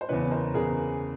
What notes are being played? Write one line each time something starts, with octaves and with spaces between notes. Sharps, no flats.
C5
E2 C#3 E3 B4 C#5
A#4 C5
E2 C#3 E3 G#4 A#4